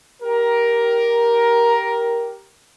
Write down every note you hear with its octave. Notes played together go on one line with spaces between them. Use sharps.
G4 A#4